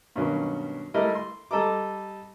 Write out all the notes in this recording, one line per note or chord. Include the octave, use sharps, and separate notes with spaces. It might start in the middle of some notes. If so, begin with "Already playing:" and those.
G2 B2 D#3 F#3 C#4
G3 A3 E4 A#4 D#5
C6
G3 A4 D#5 A#5 D6